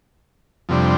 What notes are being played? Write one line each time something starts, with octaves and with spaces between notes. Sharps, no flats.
F2 C3 G3 D4